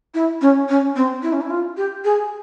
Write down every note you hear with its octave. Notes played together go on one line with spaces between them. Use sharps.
E4
C#4
C#4
C4
E4
C#4
E4
F4
G4
G#4